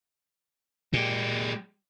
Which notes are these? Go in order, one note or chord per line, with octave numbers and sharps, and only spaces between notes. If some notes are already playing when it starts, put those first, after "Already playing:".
A#2 G#3 G4